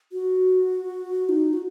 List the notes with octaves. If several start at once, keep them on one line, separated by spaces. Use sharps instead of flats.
F#4
D#4
F#4